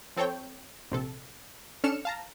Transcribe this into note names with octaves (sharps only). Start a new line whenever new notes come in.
F3 C4 A4 C#5 G5
A#1 C3 A4
C#4 D4 A4 F6 C#7 E7
F5 A5 A#5